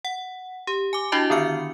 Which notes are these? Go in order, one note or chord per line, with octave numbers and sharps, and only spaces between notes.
F#5
G4
G#5 D6
D4 E4 F#4 D#5 A5
D3 D#3 B3 F6 C#7